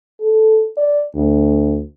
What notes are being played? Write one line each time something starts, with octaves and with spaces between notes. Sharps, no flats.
A4
D5
D2